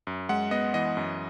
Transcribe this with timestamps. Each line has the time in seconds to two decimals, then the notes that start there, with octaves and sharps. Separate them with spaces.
0.07 F#2
0.29 G#3 F#5
0.51 B3 D#5
0.74 E3 D#5
0.97 F#2